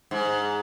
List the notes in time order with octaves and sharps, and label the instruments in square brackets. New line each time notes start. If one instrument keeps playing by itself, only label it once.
[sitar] G#2